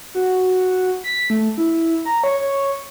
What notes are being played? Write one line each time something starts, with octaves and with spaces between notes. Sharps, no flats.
F#4
B6
A3
E4
A#5
C#5
C#5